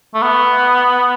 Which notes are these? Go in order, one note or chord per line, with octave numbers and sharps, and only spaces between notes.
A3
B3